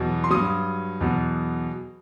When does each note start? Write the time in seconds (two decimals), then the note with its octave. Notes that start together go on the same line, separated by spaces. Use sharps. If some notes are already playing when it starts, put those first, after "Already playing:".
Already playing: E2 B2 F#3
0.24 C6
0.31 G2 F#3 D#6
1.01 E2 B2 F#3